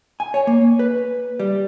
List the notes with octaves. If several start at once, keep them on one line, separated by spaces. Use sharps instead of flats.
G#5
C#5
A#3
B4
G3